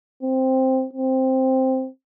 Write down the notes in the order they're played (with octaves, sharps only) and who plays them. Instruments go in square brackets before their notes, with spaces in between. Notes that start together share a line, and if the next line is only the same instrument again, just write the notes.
[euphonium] C4
C4